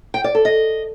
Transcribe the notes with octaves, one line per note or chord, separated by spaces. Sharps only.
G5
D5
A4
D#5